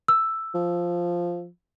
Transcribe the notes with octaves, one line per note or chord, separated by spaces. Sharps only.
E6
F3